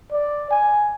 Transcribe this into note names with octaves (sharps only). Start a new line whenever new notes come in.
D5
G#5